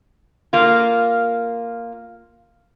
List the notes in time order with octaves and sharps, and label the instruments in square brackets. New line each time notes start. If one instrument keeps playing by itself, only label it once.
[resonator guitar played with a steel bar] A#3 F4